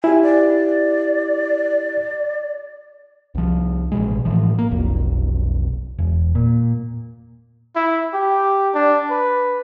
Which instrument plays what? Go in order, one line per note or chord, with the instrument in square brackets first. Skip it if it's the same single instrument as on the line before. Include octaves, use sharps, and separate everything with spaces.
[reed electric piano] E4 G4 [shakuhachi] G#5
[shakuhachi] D5
[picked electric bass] C2 F3
A1 B2 G#3
A2 E3 F3
A#3
F1 B1
E1
A#2
[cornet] E4
G4
D4
B4